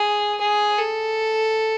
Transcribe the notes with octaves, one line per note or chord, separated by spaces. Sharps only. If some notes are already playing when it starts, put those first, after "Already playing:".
Already playing: G#4
G#4
A4